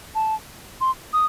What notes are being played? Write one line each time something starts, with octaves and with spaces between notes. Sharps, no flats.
A5
C6
D#6